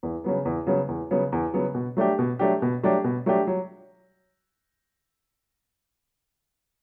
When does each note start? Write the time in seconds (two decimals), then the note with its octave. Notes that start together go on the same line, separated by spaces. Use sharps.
0.03 E2
0.24 C#3 F#3 B3
0.45 E2
0.66 C#3 F#3 B3
0.88 E2
1.11 C#3 F#3 B3
1.32 E2
1.54 C#3 F#3 B3
1.75 B2
1.97 F#3 A3 D4 G4
2.19 B2
2.39 F#3 A3 D4 G4
2.62 B2
2.83 F#3 A3 D4 G4
3.04 B2
3.26 F#3 A3 D4 G4
3.47 F#3